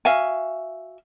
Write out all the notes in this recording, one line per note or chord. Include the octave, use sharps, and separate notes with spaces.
F#4 E5 F5 G#5